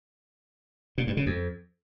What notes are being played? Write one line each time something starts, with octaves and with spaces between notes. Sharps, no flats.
A#2
G2
C#3
F2